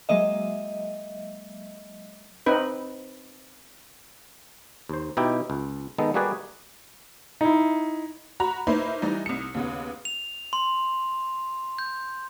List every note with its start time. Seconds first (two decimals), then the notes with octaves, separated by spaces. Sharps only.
0.09 F#3 G#3 A#3 D#5 E5
2.46 C4 D#4 B4
4.89 D#2 C5
5.17 B2 D#4 E4 G4 G5
5.50 C#2
5.98 D#3 G#3 B3 D#4 A4
6.14 G3 A#3 F#4 G#4 B4 D5
7.41 D#4 E4
8.40 F#4 A#5 B5
8.67 A#3 D#4 E4 B4 C5
9.02 E3 G3 D#4
9.26 C2 C#7
9.54 D#2 C#3 B3
10.05 F7
10.53 C6
11.79 G6